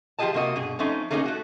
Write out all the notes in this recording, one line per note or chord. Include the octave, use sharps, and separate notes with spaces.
F3 F4 G4 G#4 D#5 A5
C3 A#3 F#4 D#5
G2 B2 G#4
F3 A3 C4 C#4 D#4
A3 A#3 C#4 D#4 G4 G#4
A3 F#4